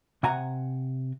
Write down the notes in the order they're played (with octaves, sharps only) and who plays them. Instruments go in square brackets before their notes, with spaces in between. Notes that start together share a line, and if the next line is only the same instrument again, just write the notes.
[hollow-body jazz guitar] C3 F#5 G#5 A#5